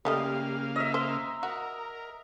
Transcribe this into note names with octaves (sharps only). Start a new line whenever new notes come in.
C#3 G3 A3 A#3 G4 D#5 F5
D#5 E5 A#5
C5
F#4 A#4